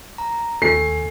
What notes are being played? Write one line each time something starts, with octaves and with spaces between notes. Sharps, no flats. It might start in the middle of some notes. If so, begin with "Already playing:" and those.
A#5
D#2 A3 G#5 C7